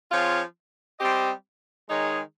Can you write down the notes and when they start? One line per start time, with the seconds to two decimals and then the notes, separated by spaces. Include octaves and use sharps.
0.11 F3 C4 F4 G#4 C#5
0.99 G3 C4 G4 C5 D#5
1.88 D#3 G#3 D#4 G#4 C#5